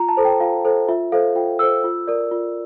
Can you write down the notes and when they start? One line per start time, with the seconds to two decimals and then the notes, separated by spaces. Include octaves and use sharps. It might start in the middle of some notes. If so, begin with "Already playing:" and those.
Already playing: F4 A#5
0.09 A5
0.17 A4 C5
0.25 G5
0.40 F4 F5
0.65 A4 C5
0.88 F4 E5
1.12 A4 C5 F5
1.35 F4 G5
1.59 A4 C5 E6
1.84 F4
2.07 A#4 D5
2.31 F4